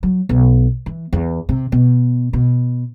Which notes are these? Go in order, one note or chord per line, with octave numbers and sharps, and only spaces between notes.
F#3
B1
E3
E2
C3
B2
B2